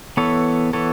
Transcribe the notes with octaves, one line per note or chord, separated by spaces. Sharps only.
E3 B3 A4 C#5
E3 B3 A4 C#5